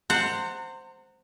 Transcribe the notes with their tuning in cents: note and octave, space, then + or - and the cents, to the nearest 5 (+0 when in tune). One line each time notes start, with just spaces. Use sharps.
C5 +0 F#5 +0 A#5 -40